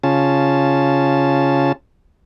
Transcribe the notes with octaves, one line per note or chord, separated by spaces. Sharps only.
C#3 C#4 F4 A5